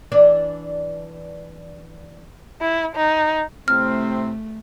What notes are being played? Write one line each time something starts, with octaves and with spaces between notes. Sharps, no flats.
E3 D4 D5
E4
D#4
A2 C3 A3 C4 F6